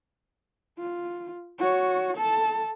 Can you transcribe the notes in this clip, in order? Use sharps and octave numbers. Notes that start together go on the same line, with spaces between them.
F4
F#4 C#5
A4 A5